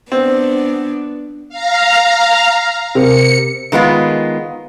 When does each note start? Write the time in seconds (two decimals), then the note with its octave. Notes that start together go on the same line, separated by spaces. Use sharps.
0.12 B3 C4 D4
1.49 F5 A#5
2.95 C3 A#4 C#7
3.72 D#3 G#3 B3 F4